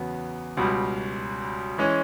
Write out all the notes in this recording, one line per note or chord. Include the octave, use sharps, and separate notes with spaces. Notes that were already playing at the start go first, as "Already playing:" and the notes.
Already playing: E2 C#3 F#3 B3
C#2 B2 G3
E3 G#3 C#4